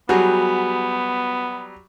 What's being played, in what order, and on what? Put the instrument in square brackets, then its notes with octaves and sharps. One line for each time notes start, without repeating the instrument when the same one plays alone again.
[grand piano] F#3 G3 [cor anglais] B3 [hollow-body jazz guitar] F#4 G#4